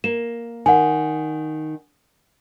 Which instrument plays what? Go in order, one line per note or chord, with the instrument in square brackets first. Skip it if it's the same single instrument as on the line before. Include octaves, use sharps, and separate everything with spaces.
[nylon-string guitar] A#3 [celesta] E7
[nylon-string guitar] D#3 [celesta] F#5 G#5